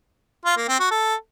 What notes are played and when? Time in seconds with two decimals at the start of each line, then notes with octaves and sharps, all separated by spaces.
0.46 F4
0.57 A#3
0.68 C4
0.80 F#4
0.91 A4